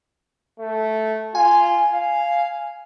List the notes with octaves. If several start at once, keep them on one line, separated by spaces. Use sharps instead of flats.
A3
F4 G#5
F5